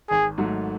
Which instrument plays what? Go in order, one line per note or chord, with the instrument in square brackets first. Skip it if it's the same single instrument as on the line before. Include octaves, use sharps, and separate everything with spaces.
[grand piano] G#1 [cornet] G#4
[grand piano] G#2 F#3 A3